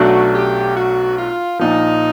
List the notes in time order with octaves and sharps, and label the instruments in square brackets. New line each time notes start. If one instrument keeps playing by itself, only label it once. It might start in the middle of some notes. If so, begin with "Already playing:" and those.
Already playing: [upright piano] B1 B2 F#3 A3 D4 [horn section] F#4
[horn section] G4
F#4
F4
[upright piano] A#1 A#2 F3 [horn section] D#4